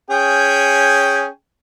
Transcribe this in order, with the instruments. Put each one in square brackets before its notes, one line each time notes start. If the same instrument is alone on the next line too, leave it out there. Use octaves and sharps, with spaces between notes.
[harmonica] C#4 G#4 G5